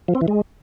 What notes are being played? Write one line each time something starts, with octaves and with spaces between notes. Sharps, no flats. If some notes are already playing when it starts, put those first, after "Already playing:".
F3
C4
E3
G#3